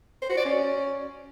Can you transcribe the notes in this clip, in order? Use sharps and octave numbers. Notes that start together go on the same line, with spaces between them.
C5
F#4
D5
C#4